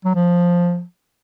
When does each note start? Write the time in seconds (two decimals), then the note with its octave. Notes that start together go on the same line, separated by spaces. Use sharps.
0.05 F#3
0.15 F3